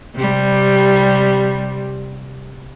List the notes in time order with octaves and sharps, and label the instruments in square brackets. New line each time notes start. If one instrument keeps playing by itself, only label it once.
[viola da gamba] C3 G3